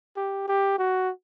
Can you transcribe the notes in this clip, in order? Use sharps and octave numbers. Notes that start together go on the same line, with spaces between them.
G4
G4
F#4